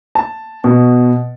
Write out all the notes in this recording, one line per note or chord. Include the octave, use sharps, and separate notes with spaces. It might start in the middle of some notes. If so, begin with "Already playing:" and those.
A5
B2